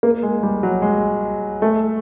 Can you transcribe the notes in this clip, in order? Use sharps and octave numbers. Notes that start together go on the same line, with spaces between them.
A#3
G#3
G3
F#3
G#3
A3